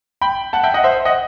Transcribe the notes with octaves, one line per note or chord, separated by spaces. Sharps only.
G5 B5
F#5 A5
E5 G5
D#5 F#5
C5 E5
D#5 F#5